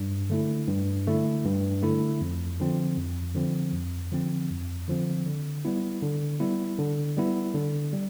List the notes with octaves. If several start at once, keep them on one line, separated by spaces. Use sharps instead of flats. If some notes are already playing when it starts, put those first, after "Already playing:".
Already playing: G2
D3 A3 E4
G2
D3 A3 E4
G2
D3 A3 E4
F2
D3 F3 C4
F2
D3 F3 C4
F2
D3 F3 C4
F2
D3 F3 C4
D3
G3 B3 E4
D3
G3 B3 E4
D3
G3 B3 E4
D3
G3